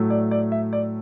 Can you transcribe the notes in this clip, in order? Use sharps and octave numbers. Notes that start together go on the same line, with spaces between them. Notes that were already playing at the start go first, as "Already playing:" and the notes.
Already playing: A2 F#3 A3
D5
D5
E5
D5